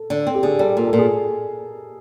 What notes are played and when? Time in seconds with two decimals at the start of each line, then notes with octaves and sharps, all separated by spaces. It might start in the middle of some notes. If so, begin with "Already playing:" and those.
Already playing: A4
0.10 D3
0.27 C4
0.35 G4
0.43 D3 G#4
0.59 G3 A4
0.76 A#2 A#4
0.87 A4
0.93 A#2
0.98 G#4